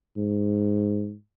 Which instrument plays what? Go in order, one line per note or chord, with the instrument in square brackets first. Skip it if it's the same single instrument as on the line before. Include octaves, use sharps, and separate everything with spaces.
[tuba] G#2